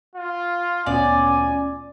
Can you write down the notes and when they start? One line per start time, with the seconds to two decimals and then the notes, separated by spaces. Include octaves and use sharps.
0.16 F4
0.86 D2 A#2 B3 C#4 D5 G#5